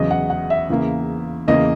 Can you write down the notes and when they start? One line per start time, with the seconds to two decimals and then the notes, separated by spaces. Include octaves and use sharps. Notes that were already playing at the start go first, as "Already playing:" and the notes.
Already playing: E2 C#3 F#3 D#5
0.11 F#5
0.30 F#5
0.50 E5
0.70 E2 C#3 E3 A#3
1.48 E2 C#3 E3 A#3 D#5